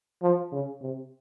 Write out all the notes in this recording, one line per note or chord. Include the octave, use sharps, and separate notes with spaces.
F3
C#3
C3